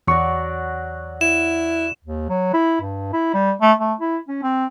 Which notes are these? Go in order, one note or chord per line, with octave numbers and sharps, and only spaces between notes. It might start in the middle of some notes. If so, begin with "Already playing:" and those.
E2 F#3 F#4 D5 C#6
E4 E7
D#2
F#3
E4
G2
E4
G3
A3
A3
E4
C#4
C4